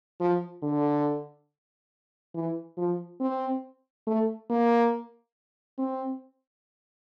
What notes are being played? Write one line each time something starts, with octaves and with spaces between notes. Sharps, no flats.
F3
D3
E3
F3
C4
A3
A#3
C4